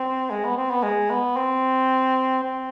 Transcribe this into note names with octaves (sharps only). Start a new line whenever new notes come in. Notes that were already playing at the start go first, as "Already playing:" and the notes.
Already playing: C4
G#3
B3
C4
B3
G#3
B3
C4
C4